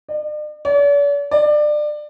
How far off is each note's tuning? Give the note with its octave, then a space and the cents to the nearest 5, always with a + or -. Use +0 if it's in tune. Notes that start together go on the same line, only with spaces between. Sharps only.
D5 +45
D5 -45
D5 +25